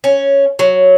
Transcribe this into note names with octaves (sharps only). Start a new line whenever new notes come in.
C#4
F#3